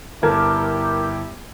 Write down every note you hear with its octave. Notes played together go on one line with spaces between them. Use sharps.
G1 E4 G4 A#4 A5 G#6